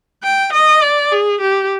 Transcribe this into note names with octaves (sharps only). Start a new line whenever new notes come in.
G5
D#5
D5
G#4
G4